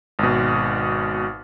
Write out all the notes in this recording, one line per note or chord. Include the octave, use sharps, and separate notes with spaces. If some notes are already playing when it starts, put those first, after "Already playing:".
G#1 B2